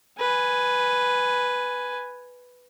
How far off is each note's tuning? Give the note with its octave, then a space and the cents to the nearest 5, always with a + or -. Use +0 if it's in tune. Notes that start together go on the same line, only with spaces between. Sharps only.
B4 +0 G#5 +0